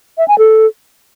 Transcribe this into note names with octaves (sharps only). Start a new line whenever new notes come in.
E5
G#5
A4